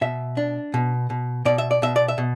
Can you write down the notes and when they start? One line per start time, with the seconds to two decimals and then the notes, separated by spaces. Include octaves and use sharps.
0.01 B2 E5
0.37 D4
0.74 B2
1.10 B2
1.45 B2 D5
1.58 E5
1.71 D5
1.82 B2 E5
1.96 D5
2.08 E5
2.18 B2